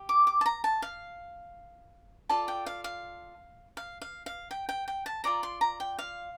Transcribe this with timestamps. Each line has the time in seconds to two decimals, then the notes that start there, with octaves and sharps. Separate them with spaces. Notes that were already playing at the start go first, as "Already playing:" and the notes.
Already playing: G4
0.09 D6
0.27 D6
0.41 A5
0.46 A#5
0.64 A5
0.82 F5
2.29 F4 A4 D5 A5
2.48 G5
2.66 F5
2.84 F5
3.77 F5
4.02 F5
4.26 F5
4.51 G5
4.69 G5
4.88 G5
5.06 A5
5.24 F4 A4 D5 A#5
5.43 C6
5.61 A#5
5.80 G5
5.99 F5